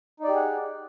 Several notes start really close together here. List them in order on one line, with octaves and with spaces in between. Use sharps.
D#4 D5 G4 G#4 F#5